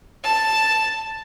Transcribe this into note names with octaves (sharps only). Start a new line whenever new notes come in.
A5